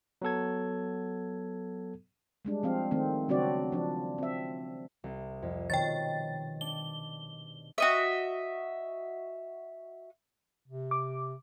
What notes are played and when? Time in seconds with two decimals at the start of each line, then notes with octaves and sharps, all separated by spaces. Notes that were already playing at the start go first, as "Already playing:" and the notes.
0.22 F#3 B3 A4 G#6
2.45 G3 G#3 D4
2.63 F3 C4 F5
2.91 D#3 A3 C4
3.28 C#3 F#3 C4 D4 F#4 D5
3.72 F3 D4
4.18 C4 E5
5.04 C2
5.42 F2
5.70 B2 D#3 C#5 G5 A6
6.61 D4 G7
7.78 F#4 D#5 E5
10.68 C3
10.91 D6